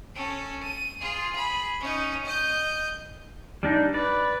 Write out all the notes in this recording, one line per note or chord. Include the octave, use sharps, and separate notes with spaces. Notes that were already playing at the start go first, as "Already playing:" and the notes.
C#4 A4
D#7
F4 G#4
G#4 B5
C#4 D#4
D#5 G6
G3 D4 D#4
B4 D5